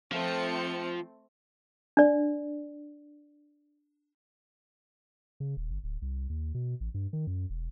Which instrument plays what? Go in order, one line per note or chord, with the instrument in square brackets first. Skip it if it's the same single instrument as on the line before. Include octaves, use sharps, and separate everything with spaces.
[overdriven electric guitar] F3 [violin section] A3 C4 C#7
[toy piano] D4 D5
[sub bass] C#3
D#1
G1
D1
C2
D#2
B2
A1
G2
D#3
F#2
E1